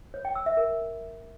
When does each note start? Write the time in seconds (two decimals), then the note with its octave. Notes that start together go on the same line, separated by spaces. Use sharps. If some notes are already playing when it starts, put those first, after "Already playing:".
0.14 C#5
0.25 G5
0.35 E6
0.46 E5
0.57 A#4